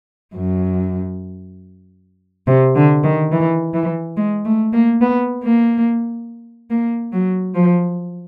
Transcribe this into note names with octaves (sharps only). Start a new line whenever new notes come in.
F#2
C3
D3
D#3
E3
E3
G#3
A3
A#3
B3
A#3
A#3
F#3
F3